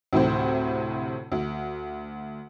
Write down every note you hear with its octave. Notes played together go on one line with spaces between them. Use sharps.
D2 A2 C3 C5
D2